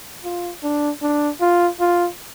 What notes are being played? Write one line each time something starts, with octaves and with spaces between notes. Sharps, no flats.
F4
D4
D4
F4
F4